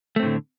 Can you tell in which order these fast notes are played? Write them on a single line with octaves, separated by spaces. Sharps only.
A3 C4 A2 D3